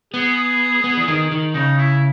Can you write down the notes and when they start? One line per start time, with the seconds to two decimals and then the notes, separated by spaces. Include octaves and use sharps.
0.14 B3 G#4
0.84 B3
0.97 E3
1.08 D#3
1.31 D#3
1.54 C#3 D#4
1.78 E4